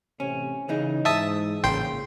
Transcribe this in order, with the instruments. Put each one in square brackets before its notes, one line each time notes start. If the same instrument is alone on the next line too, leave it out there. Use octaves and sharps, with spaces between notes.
[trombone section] A1 C3 [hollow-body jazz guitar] C#4
[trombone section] C#3 [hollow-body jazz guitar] E3 D#4
[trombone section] G#2 [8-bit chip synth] E5 A5 D#6
[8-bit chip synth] A1 G5 C6 [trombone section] A#2 C#3